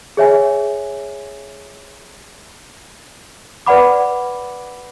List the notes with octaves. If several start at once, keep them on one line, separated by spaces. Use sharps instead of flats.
G#4 C#5 E5 G#5
B4 D5 F#5 B5 D6